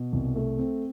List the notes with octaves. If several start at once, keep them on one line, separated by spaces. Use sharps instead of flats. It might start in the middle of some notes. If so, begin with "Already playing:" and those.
Already playing: B2
C2
A3
C4